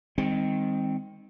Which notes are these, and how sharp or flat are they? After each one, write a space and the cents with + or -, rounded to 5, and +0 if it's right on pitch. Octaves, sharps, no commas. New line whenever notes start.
D#3 +10 G#3 -45 C4 +0